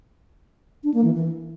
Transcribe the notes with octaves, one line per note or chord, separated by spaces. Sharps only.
D4
A#3
E3
E3